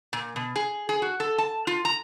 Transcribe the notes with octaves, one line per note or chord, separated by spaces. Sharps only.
A#2
B2
G#4
G#4
F#4
A4
A5
F4
A#5